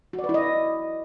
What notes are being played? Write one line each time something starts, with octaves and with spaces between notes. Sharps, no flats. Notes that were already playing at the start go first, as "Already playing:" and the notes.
F#4
D5
B4
E4
D#5